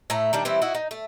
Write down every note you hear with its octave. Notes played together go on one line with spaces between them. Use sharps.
A2 A3 A#5
D#3 G3 D4
E3 G3 C4 E4
E4 F#4 D#5
D#4
A3